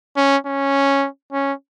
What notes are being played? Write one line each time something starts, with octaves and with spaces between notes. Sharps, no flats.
C#4
C#4
C#4